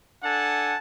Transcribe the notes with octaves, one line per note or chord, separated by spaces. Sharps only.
D4 A4 F#5 G#5 A5